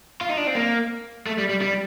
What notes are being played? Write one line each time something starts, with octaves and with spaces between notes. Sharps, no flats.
F4
D#4
D4
C4
A#3
A3
G3
G3
G3